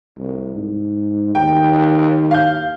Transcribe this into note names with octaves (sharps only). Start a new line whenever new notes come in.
C2
G#2
D#2 G5
F5 G6